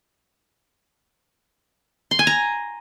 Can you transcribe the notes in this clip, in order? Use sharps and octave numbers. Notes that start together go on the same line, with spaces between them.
C6
G#5
A#5